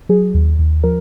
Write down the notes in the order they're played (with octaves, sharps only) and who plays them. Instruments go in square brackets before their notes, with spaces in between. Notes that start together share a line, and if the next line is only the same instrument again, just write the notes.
[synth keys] F#3 G#4
D#2
D#2
F3 A#4